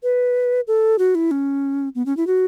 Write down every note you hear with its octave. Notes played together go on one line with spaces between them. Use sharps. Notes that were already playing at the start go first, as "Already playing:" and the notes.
B4
A4
F#4
E4
C#4
B3
C#4
E4
F#4